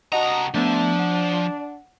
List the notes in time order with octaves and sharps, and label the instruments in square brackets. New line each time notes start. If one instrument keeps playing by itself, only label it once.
[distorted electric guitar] C2 A#5 [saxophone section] D4 F#4 D#5 [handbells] F#5 A5
[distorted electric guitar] F3 [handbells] A3 B3 [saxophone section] D4
[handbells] F#5